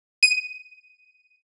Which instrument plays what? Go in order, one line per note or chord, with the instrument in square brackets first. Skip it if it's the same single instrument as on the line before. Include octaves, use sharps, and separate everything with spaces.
[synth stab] D#7